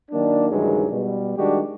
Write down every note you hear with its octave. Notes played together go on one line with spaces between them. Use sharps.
D#3 F#3 A#3 D4
C#2 G2 D#3 E3 F#3 G#3
B2 G3
D#3 G3 G#3 D4 F#4 G4